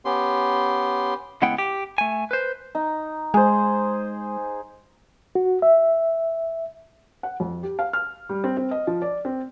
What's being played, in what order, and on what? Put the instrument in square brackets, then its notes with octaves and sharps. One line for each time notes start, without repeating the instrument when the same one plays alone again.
[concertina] B3 C#4 G4 C6
[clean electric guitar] C#3 G#3 B3 E4 F#5 G5
G4
A3 G#5
B4 C5
[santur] D#4
[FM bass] G#3 [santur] G#4 C5
[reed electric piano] F#4
E5
[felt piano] F#5
F2
G4
F5
F6
G3
C4
C4
D#5
F3
D5
C4